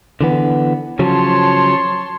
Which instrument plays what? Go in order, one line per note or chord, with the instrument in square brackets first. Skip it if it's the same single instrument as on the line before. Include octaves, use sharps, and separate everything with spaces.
[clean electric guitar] D3 E3 B3
[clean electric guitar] C#3 F3 F#3 [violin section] C#5 A5 C6